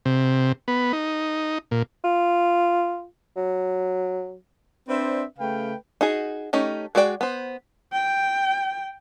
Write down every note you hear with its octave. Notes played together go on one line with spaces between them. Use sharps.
C3
B3
D#4
A#2
F4
F#3
C4 D4 B4 C5 D5 E5
C#3 A3 B4 F5 G5
D#4 F#4 G#4
A3 C#4 D#4 G4
G#3 F#4 G#4 D5 G5
B3 C5
G5